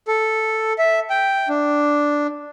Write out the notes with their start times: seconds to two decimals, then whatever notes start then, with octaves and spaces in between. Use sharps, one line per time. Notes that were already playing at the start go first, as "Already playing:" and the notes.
0.08 A4
0.78 E5
1.10 G5
1.49 D4